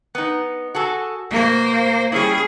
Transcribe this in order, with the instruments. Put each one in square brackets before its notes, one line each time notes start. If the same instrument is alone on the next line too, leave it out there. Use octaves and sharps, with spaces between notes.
[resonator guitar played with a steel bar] B3 D#4
F#4 G#4 A4
[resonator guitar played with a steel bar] B2 [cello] A#3 C5
[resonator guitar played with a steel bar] G3 C#4 E4 [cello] G#4